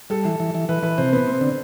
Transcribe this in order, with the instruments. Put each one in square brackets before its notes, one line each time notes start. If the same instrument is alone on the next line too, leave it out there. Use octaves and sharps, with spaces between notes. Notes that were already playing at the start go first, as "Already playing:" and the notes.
[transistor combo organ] G3 [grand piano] A4
[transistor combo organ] E3
E3
E3
[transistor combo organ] E3 [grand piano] B4
[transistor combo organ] E3 [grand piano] B4
[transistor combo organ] C3 [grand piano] C5
[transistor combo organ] B3 [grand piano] B4
[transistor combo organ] C4
D3